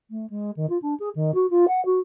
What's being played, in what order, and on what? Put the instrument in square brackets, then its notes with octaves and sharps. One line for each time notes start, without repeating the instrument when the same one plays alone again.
[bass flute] A3
G#3
D#3
F4
D4
G#4
D#3
F#4
F4
F#5
F#4